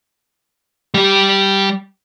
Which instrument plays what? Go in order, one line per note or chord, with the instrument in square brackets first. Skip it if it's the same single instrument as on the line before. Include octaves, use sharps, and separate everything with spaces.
[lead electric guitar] G3 G4